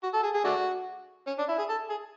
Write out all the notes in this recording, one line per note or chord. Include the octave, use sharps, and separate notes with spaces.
F#4
A4
G#4
G#4
A3 D4 F#4
C#4
D4
E4
G#4
A4
G#4